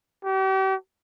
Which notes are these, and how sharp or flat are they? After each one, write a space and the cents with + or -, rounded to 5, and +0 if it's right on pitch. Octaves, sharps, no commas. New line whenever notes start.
G4 -40